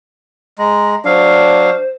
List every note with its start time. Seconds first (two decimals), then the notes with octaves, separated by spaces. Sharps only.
0.58 G#3 A#5
1.05 F#3 D4 C5 F5